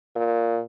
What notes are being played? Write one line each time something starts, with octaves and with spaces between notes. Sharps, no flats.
A#2